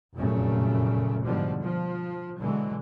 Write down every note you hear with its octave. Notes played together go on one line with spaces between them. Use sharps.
F1 F#2 A#2 C#3 A3
G#2 B2 D3 F3 G3
F3
B2 D3 E3 F#3 G#3